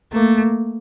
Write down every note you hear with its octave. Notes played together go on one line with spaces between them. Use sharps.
A3 A#3